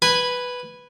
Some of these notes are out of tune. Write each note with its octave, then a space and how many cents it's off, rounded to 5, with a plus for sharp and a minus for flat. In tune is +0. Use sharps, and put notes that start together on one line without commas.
B4 +0 G#5 -10